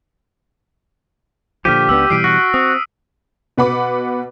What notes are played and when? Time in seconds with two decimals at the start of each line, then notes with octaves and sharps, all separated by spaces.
1.65 A#2 D3 F3 G4 F6 B6 D#7
1.89 C#2 B3 D4 E6
2.10 B2 E3 G3 C7 D7
2.24 F#4
2.54 C4 D#6
3.58 B2 B4 F#5 B5 D6